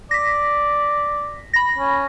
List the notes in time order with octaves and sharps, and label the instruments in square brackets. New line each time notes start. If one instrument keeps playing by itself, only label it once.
[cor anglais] D5 [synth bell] A#6 B6
[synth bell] B5 A#6
[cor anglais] C#4